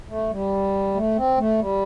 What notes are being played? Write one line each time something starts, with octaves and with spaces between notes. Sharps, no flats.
A3
G3
A3
C4
A3
G3